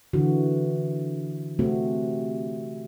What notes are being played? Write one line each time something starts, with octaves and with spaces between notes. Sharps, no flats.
D3 E3 F#4
C3 A3 C4 F#4